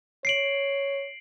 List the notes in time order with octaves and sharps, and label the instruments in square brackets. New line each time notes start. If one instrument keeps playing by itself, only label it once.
[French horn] C#5 [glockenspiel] C7 D7 F#7